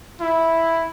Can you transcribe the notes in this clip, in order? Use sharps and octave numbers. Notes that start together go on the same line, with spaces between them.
E4